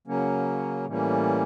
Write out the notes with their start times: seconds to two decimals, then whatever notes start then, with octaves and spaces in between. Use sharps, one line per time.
0.07 C#3 F#3 A#3 C#4
0.86 A2 E3 G3 A#3 C#4